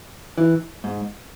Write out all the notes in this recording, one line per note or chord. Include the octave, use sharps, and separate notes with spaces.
E3
G#2